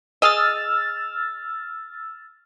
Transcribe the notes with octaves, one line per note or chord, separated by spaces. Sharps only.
G#4 D#5 E6 F6 A6